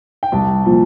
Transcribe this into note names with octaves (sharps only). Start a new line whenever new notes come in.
G5
C2 A5
A#2 F3